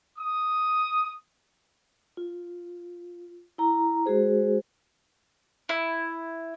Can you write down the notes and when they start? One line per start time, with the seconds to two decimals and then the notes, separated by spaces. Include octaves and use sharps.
0.18 D#6
2.17 F4
3.58 E4 A#5
4.06 G#3 F#4 G#4 C5
5.69 E4